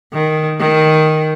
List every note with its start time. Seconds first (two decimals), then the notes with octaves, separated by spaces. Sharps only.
0.13 D#3
0.59 D#3